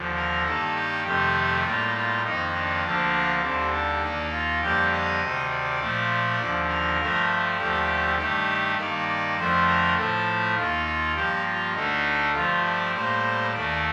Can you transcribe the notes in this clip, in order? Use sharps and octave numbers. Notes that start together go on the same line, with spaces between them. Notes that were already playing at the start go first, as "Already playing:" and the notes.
Already playing: D#2 D3 F3
A#4
G2 D#3 A#3 A4
G4
F2 C3 D#3 A3 G4
A2 G3 A#3 F4
F4
F2 D#3 A#3 D#4
D4
D2 D3 F3 A#3
D#2 D3 G3 C4
D4
D#2 D#3 A#3
F4
F2 D3 G3 A#3 G4
D#5
D2 C3 D#3
D5
A#2 F3 A3
D#2 D3 F3
A#4
G2 F3 A3
D#2 D3 F3 A3 G4
G2 D#3 A3 G4
G2 D#3 A#3 D5
D5
F2 D3 F3 A3 C5
A#4
A2 F3 A3 A4
D#2 D#3 A#3 F4
F4
G2 F3 A#3 G4
F4
D2 D3 A3 D#4
G2 F3 A3 F4
D5
A2 G3 A#3 C5
D#2 D#3 A3 D5